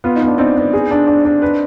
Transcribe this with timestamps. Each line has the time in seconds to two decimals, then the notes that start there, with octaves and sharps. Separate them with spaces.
0.04 B3 F4
0.15 D#4
0.22 B3 D4
0.38 C4 D#4 D5
0.57 B3
0.73 G#4
0.91 D4
1.07 D4
1.25 D4
1.42 B4